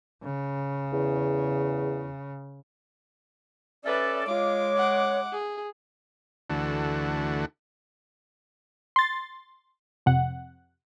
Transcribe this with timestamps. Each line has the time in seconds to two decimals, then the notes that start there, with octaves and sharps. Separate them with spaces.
0.24 C#3
0.93 E2
3.84 C#4 A4 B4 D5 E5
4.27 G#3 F4 C#5 D6
4.77 F#5
5.32 G#4
6.50 D2 D3 E3 A3 F#4
8.96 C6 A6
10.06 F2 C3 F#5